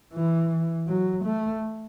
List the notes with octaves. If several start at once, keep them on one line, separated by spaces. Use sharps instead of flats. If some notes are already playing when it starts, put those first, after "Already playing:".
E3
F#3
A3